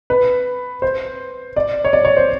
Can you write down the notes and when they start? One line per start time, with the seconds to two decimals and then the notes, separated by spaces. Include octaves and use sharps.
0.10 B4
0.82 C5
1.56 D5
1.85 C#5
1.93 D5
2.05 C#5
2.17 C5